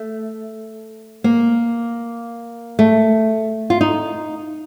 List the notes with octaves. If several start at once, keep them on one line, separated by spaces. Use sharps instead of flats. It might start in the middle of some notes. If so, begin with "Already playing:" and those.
Already playing: A3
A#3
A3
F4
D#4